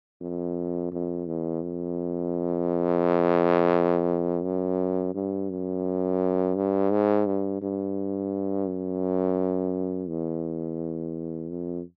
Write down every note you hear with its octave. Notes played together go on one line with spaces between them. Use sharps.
F2
F2
E2
F2
F#2
G2
F#2
G2
G#2
G2
G2
F#2
E2
F2